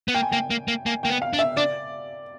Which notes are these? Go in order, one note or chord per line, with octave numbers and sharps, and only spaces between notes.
B3
A#3 G5
G#5
A#3 G5
A#3
A#3
A#3 G#5
A#3 G5
B3
F5
D4
E5
D4 D5